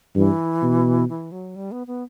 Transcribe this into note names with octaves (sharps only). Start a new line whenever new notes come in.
G2 E3
B2
E3
F#3
G3
B3
B3